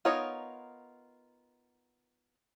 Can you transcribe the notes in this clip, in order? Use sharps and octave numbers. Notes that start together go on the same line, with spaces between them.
B3 D#4 F4 A#4 C#5